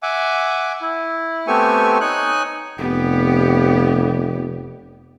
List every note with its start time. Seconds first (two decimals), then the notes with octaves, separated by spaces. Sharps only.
0.03 E5 F#5 G#5 D6
0.81 E4
1.47 A3 B3 C4 G4 G#5 C#6
2.01 D#4 C#5 G#5 F#6
2.78 F1 B3 G4